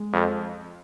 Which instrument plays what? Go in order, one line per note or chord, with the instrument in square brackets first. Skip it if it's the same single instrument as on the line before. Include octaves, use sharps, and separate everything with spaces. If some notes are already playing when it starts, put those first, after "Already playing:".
Already playing: [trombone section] G#3
[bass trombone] F2